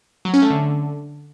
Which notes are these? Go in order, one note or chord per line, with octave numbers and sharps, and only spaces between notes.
F#3
C#4
A3
D3